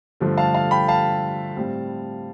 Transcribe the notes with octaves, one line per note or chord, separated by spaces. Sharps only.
G2 D3 F3 A3
F5 A5
F5 A5
G5 B5
F5 A5
A2 G3 C4